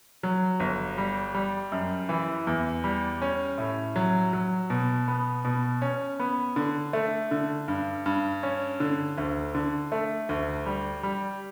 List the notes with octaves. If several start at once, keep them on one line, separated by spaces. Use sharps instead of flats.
F#3
G1
G3
G3
F#2
E3
E2
G3
C#4
A2
F#3
F#3
B2
B3
B2
C#4
B3
D3
A3
D3
G2
G2
C#4
D3
D2
D3
A3
D2
G3
G3